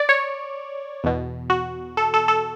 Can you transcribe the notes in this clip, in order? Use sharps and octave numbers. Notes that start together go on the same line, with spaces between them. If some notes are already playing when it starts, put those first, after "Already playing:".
Already playing: D5
C#5
E2 B2
F#4
A4
A4
A4